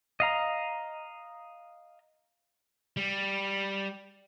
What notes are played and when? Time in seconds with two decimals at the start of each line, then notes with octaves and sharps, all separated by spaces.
0.20 D#5 F5 A#5
2.97 G3